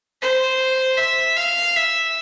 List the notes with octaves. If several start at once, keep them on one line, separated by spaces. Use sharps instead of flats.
C5
E5
F5
E5